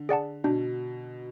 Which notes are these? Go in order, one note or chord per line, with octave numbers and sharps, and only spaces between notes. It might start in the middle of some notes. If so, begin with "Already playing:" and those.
Already playing: D3
G#4 D5 F#5 A5
B2 D4